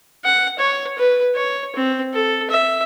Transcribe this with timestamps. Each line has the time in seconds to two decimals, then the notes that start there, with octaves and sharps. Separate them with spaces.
0.25 F#5
0.58 C#5
0.98 B4
1.35 C#5
1.76 C4
2.14 A4
2.50 E5